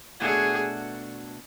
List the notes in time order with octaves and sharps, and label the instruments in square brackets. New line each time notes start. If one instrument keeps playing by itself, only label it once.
[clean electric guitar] B2 A3 D4 F#4 C#5 [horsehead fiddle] G#4